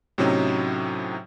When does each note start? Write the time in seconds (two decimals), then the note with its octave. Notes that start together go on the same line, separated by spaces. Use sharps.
0.18 A2 C3 F#3 C4 C#4 D#4